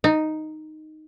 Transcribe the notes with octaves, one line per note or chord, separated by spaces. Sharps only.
D#4